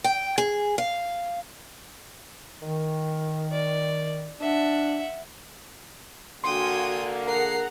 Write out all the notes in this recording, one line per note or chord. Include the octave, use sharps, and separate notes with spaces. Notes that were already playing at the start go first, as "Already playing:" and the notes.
G5
G#4
F5
D#3
D5
D4 E5 F#5
D3 A#3 F#4 G5 G#5 C6 D#6
G#4 A#4 F#5 A#5 C7